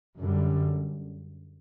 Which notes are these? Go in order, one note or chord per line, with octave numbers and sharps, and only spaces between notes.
F#2 D3 G3